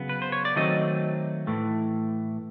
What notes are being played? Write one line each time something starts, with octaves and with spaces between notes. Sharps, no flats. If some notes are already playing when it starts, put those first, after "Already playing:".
Already playing: C#3 F#3 B3
B4
C5
C#5
D5
D#3 F#3 A3 C4 D#5
A2 E3 A3